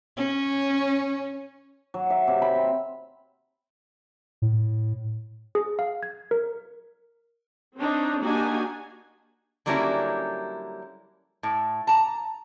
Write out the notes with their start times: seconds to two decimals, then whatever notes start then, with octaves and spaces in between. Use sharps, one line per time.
0.17 C#4
1.94 F#3
2.10 E5
2.28 C3
2.42 B5
2.56 C4
4.42 A2
5.55 G#4
5.79 F5
6.03 G#6
6.31 A#4
7.77 C4 D4 D#4 C#5
8.22 A#3 D4 D#4 F#4 G4 G#5
9.66 D3 F#3 G3 A#3 C#4 E4
11.43 A2
11.87 A5 A#5